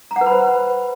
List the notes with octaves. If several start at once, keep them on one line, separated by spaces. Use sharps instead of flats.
A#5
F#5
B4
B5
C5